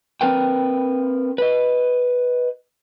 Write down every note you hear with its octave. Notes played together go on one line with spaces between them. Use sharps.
C4 A#4 B4 G5
B4 D#5